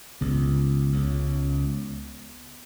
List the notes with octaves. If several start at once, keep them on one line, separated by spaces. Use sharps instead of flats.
C#2 C#3 B3
C#2 C#3